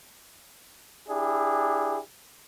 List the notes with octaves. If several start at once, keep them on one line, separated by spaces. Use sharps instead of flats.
D4 E4 G4 G#4